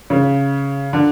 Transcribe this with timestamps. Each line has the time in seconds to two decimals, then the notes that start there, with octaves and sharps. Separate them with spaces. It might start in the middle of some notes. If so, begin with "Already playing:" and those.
0.10 C#3
0.93 D3